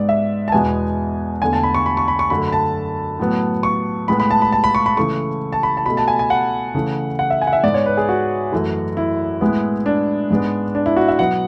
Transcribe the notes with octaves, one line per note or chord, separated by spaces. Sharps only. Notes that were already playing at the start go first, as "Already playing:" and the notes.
Already playing: G#2 G#3 B3 D5
E5
A5
E2 B2 G#3 B3 G#5
E2 D3 A3 G#5
A5
B5
C#6
B5
C#6
B5
C#6
F#2 D3 A3 B5
B5
A5
A2 F#3 B3
C#6
A2 G#3 B3 B5
B5
A5
B5
A5
B5
C#6
B5
C#3 E3 A3 C#6
A5
B5
A5
B2 A3 B5
A5
G#5
G#5
F#5
C#3 E3 A3
F#5
E5
G#5
F#5
E5
G#2 G#3 B3 D5
C#5
B4
G#4
F#4
F#2 E3 A3
E4
A2 G#3 B3
D4
G#2 G#3 B3
D4
E4
F#4
E5
B2 F#3 B3 F#5